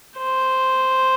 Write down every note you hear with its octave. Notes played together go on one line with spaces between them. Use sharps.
C5